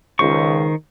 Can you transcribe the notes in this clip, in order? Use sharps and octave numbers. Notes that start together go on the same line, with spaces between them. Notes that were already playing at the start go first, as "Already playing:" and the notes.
C#2 D#3 C5 C#6